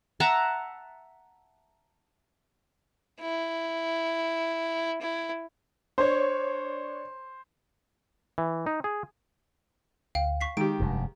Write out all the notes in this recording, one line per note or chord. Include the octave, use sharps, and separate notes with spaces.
E5 F#5 A5 A#5
E4
E4
D4 C5 C#5
E3
D#4
G#4
D2 F5 G5
C#6 B6 C7
D#3 G#3 G4 D7
F1 G2